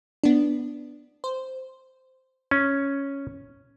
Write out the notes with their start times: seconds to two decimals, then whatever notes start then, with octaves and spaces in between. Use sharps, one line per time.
0.24 B3 D4
1.24 C5
2.51 C#4